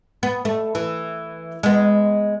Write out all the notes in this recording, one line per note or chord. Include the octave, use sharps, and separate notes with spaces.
B3
A3
E3
G#3 B3